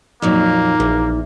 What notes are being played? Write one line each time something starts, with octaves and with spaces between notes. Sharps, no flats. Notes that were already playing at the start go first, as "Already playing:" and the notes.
F2 A#2 F#3 A#3 D#4
A#1 E2